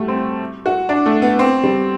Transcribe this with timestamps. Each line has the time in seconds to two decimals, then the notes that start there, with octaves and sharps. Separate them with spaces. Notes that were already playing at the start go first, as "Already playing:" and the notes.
Already playing: G3 A3 F#4
0.08 C4
0.66 F#4
0.89 D4
1.06 A3
1.22 B3
1.39 C4
1.63 G3